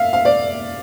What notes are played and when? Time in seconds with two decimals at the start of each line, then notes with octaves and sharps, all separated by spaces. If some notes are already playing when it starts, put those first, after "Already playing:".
Already playing: E5 F5
0.13 F5
0.25 D5